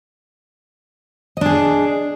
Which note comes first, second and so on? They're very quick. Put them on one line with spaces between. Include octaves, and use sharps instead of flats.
D#5 D4 G#4